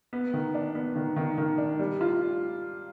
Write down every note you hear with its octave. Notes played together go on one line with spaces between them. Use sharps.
B3
D#3
D4
B3
D#3
D#3
D#3
D4
G3
F4